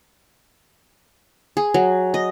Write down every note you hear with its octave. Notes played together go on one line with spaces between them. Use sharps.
G#4
F#3
D#5